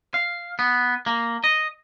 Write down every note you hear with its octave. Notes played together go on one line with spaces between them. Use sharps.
F5
B3
A#3
D#5